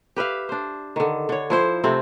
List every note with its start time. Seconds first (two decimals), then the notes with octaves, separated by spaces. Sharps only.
0.17 G4 B4 E5 F5
0.49 D4 C5
0.96 D3 D#3
1.29 D3 C#5
1.50 F3 E4 C5
1.84 C3 A3 C4 E4